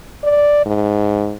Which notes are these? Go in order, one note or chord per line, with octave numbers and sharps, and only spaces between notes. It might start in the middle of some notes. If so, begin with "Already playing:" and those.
D5
G#2